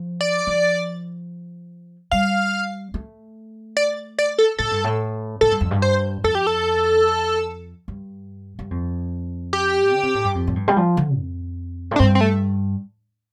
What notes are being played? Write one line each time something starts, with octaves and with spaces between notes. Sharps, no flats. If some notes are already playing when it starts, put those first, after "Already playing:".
Already playing: F3
D5
F3
G3 F5
A3
D5
D5
A4
A2 A4
G2
A2
A2 A4
G2
F2
G2
C5
F2 A4
G4
A4
G2
G2
F2
G4
D3
C3
A2
G2
F2
A2
G2
G3
F3
D3
F2
A2
D4
G2 C4
C4
A3